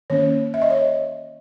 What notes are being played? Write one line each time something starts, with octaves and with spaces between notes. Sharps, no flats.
D#3 A#3 C#4 C#5
E5
D#5
C#5